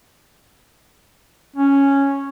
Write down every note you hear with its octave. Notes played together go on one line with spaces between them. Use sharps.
C#4